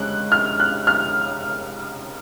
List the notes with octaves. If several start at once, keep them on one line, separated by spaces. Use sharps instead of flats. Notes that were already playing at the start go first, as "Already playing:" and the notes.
Already playing: G#3 C#4 F#6
F6
F#6
F6